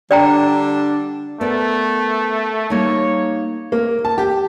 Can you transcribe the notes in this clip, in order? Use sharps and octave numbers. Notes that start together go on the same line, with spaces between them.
D3 G3 D4 D5 G5 A#5
A3 B3 A#4 D5
G3 A#3 D#4 C#5
A#3
A5
G4